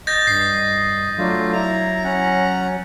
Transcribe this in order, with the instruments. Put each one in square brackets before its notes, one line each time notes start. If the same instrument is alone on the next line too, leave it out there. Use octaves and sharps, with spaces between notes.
[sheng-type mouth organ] D#5 [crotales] G6 A6 A#6
[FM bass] G2 [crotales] C7
[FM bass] F#3 [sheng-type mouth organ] A3 D4 F4
[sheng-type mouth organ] E4 A#5
C#4 F#5 A#5